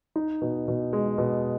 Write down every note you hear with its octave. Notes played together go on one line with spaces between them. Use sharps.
D#4
B2
B2
G#3
B2